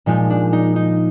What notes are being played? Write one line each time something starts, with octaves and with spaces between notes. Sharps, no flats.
A#2 F3 G#3 D#4
D4
D#4
D#4